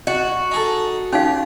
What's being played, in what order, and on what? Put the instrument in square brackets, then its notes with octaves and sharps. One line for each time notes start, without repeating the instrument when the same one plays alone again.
[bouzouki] F#4 [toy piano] D#5
[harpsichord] D#4 G#4 A4
[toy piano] C#4 D#4 F5 [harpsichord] F4